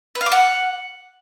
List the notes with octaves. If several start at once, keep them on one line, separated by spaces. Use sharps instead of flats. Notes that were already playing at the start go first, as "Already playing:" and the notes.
B4
F5
D6
F#5